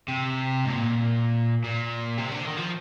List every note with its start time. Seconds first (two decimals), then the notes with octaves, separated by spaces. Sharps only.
0.08 C3
0.65 G#2
0.70 A#2
1.64 A#2
2.18 C3
2.31 D3
2.45 D#3
2.57 F3